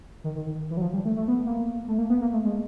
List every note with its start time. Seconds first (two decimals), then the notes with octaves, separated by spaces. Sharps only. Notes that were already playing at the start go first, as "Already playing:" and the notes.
0.24 D#3
0.36 D#3
0.46 D#3
0.70 E3
0.77 F#3
0.81 F3
0.93 G3
1.05 A3
1.16 A3
1.28 B3
1.46 A#3
1.88 A3
1.98 A#3
2.10 B3
2.21 A#3
2.33 A3
2.44 G#3